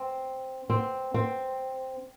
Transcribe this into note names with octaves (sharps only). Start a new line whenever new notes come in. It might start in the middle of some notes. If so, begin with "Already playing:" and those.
Already playing: C4
C4
C4